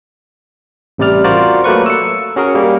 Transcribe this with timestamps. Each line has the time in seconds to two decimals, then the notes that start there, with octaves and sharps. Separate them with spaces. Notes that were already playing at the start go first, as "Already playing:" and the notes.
0.98 A1 C3 G3 D5 F6
1.24 F4 F#4 A#4 C5 D5
1.64 F#3 A3 A#3 B4 C#6
1.86 E6 C#7
2.36 C#4 F#4 G#4 A#4
2.55 G3 A#3